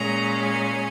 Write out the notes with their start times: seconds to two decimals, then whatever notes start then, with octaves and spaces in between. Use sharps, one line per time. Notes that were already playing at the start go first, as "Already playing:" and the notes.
Already playing: A#2 G#3 C#4 A#5
0.42 G#5